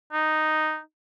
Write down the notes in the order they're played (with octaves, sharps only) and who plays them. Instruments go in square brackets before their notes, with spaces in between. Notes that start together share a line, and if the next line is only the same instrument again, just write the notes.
[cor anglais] D#4